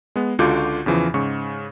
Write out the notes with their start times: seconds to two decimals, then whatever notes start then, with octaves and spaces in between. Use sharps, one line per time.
0.16 G#3 B3
0.39 C#2 D3 F4 F#4 D6 G6
0.86 E2 C#3 E3 F3
1.14 G#2 C#3 C#6